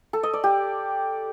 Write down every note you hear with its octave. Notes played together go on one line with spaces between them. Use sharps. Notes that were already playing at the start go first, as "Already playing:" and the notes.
A4
D#5
D5
G4